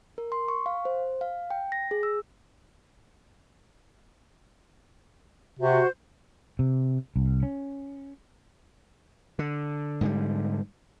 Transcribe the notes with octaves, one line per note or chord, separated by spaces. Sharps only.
A#4
C6
C#6
F5
C5
F5
G5
A#6
G#4
E6
C3 F#4 C5
C3
C2
C#4
D3
G#2 D3 G3